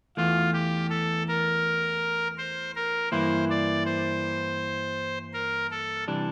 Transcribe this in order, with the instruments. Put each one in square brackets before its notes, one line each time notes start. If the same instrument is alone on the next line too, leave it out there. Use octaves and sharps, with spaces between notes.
[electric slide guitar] E2 E3 A3 [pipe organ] F4
[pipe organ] G4
A4
A#4
C5
A#4
[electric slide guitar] G2 E3 A#3 E4 [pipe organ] C5
[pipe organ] D5
C5
A#4
A4
[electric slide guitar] C3 E3 G3 D4